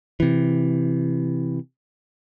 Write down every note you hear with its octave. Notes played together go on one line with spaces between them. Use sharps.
C3 E3